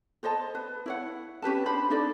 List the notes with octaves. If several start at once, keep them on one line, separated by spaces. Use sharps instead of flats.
A4 C5 D#5 A5
B4
E4 C#5 F#5
C#4 G4 B4 A5
D4 C5 A5 B5
D4 D#4 A4 D5